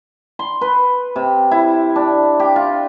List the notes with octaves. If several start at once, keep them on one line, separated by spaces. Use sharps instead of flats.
C6
B4
C3
E4
D4
G4
F4